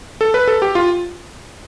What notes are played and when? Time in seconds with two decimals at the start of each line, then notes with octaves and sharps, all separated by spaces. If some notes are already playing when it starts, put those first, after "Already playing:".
0.21 A4
0.34 B4
0.48 A4
0.62 G4
0.75 F4